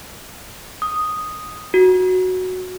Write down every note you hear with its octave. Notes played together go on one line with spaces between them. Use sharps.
D#6
F#4